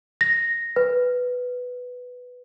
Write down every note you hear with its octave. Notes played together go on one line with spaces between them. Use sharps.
A#6
B4